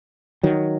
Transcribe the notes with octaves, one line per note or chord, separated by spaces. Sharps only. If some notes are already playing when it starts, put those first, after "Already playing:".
D#3 F#3